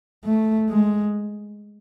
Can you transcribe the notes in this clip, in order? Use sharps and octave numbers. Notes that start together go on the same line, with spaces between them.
A3
G#3